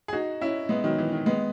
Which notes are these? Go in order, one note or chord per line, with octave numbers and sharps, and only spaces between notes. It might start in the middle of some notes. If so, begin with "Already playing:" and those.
G#4
D#4 F#4
C#4 E4
G#3 B3
D#3 F#3
E3
D#3
G#3 B3